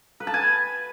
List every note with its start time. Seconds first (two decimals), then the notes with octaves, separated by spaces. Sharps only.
0.20 B4
0.27 A5
0.34 G#5